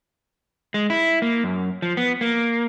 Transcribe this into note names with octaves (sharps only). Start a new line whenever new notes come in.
G#3
E4
A#3
F#2
F3
B3
A#3